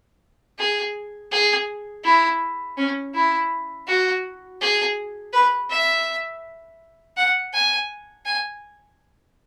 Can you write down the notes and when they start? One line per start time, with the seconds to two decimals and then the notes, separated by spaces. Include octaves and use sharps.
0.59 G#4
1.32 G#4
2.04 E4
2.77 C#4
3.15 E4
3.87 F#4
4.61 G#4
5.33 B4
5.71 E5
7.17 F#5
7.54 G#5
8.26 G#5